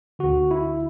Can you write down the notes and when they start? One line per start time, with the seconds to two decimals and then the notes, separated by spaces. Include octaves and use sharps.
0.19 D2 D3 F#4
0.51 E4